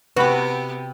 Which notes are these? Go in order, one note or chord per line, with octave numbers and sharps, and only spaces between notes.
C3 B3 F#4 G4 B4 D6